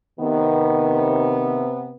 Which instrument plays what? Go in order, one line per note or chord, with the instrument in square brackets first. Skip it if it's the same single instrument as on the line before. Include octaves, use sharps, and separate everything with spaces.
[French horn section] C3 B3 [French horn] D#3